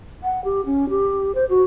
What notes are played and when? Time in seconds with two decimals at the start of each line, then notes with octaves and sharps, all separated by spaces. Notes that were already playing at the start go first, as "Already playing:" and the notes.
0.23 F#5
0.44 G4
0.66 C#4
0.89 G4
1.35 C5
1.49 F#4